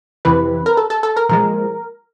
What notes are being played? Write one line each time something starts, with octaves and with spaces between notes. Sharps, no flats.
F2 C3 E3 B4
A#4
A4
A4
A4
A#4
A#2 F3 G#3 A#4